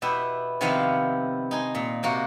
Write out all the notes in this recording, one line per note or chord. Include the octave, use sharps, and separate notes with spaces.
B2 B3 E4 G4 E5
C3 D#3 F3 B3 E4 F5
D#4 G#5 C6
A#2
C3 A#3 F#4